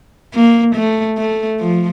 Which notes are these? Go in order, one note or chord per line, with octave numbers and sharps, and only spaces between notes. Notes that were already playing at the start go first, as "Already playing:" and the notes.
A#3
A3
A3
F3